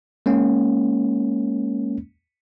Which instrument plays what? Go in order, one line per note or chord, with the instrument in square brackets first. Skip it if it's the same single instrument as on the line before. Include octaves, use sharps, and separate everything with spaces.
[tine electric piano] G#3 A#3 C#4